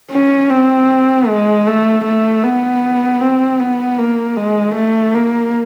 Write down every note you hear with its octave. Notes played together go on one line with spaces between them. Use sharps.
C#4
C4
G#3
A3
A3
B3
C4
B3
A#3
G#3
A3
A#3